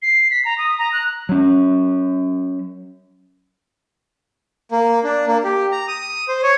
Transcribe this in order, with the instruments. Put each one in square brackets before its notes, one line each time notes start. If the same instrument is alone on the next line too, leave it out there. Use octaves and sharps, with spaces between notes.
[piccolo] C7
B6
A#5
D#6
A#5
F#6
[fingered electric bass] F#3 C#4
[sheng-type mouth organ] A#3
D4
A#3
G4
A#5
D#6
C5
C#5